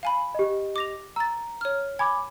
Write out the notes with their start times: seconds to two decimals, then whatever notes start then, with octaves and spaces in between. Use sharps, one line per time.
0.03 F5 G#5 B5
0.35 G4 D#5
0.76 D6 A#6 F7
1.16 A#5 E6 A6
1.61 C#5 F6
1.99 G#5 B5 D6 G#6